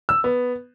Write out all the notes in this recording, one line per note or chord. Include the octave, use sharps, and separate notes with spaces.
E6
B3